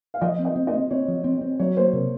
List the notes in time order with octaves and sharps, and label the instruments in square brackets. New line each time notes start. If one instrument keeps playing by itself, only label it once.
[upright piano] F5
[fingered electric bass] F3 [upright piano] D#5
[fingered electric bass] C4
[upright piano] D#5
[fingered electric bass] C4
[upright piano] D#5
[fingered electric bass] C4
[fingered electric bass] C4 [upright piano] C#5
[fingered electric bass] F3
C4
C4
[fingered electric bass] F#3 [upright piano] C#5
[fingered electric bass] A#3 [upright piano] C5
[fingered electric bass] C3 [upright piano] A#4